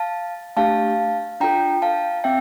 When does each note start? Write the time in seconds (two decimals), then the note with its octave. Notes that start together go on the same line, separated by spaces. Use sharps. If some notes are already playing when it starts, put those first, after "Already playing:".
Already playing: F5 A5
0.57 A3 D4 G4 F5 A5
1.40 D4 F4 A4 G5 A#5
1.82 F5 A5
2.24 C4 E5 G5